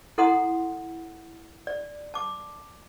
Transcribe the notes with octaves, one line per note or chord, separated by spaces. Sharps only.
E4 A4 F#5 A#5 C6 D#6
D5
A5 D6